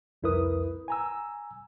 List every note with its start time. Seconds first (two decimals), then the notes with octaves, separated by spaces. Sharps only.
0.23 C2 F2 E4 A#4 B4 D#6
0.88 G#5 A#5 E6